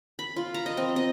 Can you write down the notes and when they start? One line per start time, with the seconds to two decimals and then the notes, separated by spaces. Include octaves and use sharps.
0.19 B5
0.36 F4
0.54 A#5
0.66 D#5
0.77 C4
0.96 D#5